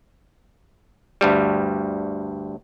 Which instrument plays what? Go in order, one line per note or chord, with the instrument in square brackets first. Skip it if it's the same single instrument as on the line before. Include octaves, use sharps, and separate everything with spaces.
[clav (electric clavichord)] D2 G2 G3